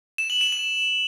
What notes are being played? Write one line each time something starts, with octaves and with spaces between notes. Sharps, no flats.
E7
F#7
E7
E7